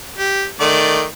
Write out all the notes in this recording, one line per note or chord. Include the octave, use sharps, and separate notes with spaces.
G4
D#3 A3 D5